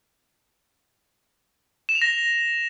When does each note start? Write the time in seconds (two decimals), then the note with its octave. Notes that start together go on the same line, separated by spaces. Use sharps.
1.89 E7
1.95 F7
2.02 A#6